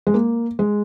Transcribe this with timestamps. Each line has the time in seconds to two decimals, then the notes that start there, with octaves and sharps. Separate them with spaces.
0.07 G#3
0.14 A#3
0.59 G#3